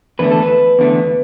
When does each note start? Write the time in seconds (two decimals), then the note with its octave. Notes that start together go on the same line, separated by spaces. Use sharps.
0.19 E2 D3 A3 B4
0.32 A4
0.42 B4
0.79 E2 D3 A3